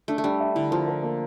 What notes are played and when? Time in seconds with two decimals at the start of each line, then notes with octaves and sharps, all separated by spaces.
0.08 A3 D4
0.18 A3
0.24 G3 D4
0.41 E5
0.55 D3 E4
0.71 F3 A#4
0.88 A#4
1.03 A#3